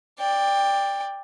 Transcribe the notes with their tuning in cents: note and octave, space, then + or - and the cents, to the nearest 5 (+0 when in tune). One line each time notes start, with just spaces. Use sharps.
D5 +0 G5 +20